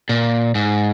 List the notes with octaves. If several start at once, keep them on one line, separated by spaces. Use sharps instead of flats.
A#2
G#2